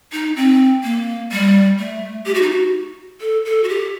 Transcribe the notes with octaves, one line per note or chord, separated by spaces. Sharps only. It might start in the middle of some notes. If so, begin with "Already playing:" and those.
D#4
C4
A#3
G3
A3
G4
F#4
D#4
F#4
A4
A4
F#4
G4